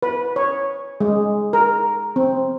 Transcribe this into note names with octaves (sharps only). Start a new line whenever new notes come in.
B4
C#5
G#3
A#4
C4